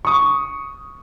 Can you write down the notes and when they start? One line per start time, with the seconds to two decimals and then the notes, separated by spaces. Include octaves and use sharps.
0.05 C#6 D#6